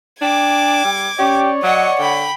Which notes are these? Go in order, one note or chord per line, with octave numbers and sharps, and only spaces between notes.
D4 G5 D6 G#6
G3
C#4 G4 C#5 D5
F#3 D#5 F#5 C#6
D3 G5 B5